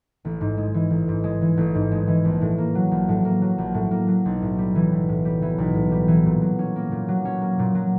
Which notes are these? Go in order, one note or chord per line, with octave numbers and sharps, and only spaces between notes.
A1
G#2
G#3
E3
A1
G#2
G#3
E3
A1
G#2
G#3
E3
A#1
A2
A#3
F#3
A#1
A2
A#3
F#3
A#1
A2
A#3
F#3
B1
A2
G3
E3
B1
A2
G3
E3
B1
A2
G3
E3
A#2
F#3
C#4
A#3
A#2
F#3
C#4
A#3
A#2
F#3